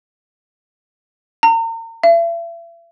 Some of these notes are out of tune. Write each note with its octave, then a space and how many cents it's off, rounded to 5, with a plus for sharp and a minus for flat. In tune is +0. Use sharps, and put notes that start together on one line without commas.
A#5 -40
E5 +40